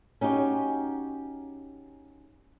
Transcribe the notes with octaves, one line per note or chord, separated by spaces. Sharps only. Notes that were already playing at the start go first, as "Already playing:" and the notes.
C#4 D#4 F#4 G4